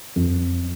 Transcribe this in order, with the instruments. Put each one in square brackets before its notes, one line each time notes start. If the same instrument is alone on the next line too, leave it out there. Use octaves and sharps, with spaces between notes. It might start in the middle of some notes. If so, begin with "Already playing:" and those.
[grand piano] F2